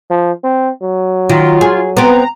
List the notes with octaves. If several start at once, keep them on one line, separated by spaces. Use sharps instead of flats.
F3
C4
F#3
D#3 F4
G#4
B3 C4 A#5